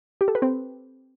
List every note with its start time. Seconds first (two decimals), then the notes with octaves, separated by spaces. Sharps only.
0.21 G4
0.28 A4
0.35 B4
0.42 C4